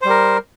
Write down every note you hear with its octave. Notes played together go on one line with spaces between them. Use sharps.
G3 A#4 C5